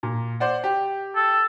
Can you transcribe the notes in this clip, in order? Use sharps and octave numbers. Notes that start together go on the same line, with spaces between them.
A#2
C5 D5 F#5
G4
A4